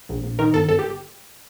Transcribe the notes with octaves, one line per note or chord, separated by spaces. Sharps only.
A#1
A#1
D#3 A#4
G1 A4
G1 A4
G4